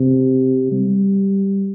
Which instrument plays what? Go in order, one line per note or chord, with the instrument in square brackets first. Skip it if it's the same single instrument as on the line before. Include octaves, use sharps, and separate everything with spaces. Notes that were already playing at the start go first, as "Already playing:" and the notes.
Already playing: [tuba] C3
G3